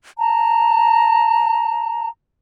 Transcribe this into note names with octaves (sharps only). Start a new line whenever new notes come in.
A5 A#5